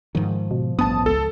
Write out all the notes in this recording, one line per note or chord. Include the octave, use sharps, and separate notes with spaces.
G#2 D#3 F3
B2
A1 G2 B3 A5 D#6
C#2 A4